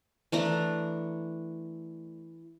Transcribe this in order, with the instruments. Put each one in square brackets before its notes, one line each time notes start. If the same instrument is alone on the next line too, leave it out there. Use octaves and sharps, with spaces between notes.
[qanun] E3 A3 D4 A#5